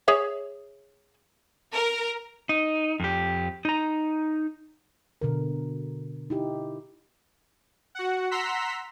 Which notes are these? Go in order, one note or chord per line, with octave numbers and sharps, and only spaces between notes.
G#4 C#5 E5
A#4
D#4
F2 G4
D#4 A#5
B2 D3 A#4
D#4 E4 G4
F#4 F#5
F#5 A#5 C6 E6 B6